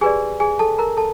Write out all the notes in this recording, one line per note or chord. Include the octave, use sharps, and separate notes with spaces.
G4 G#4 B4 D5 G#5
G#4 G#5
A4 A5
A#4 A#5
A4 A5